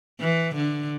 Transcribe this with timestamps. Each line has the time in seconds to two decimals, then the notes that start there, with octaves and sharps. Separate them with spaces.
0.21 E3
0.55 D3